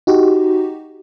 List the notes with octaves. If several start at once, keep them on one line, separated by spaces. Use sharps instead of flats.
D#4 F#4 G4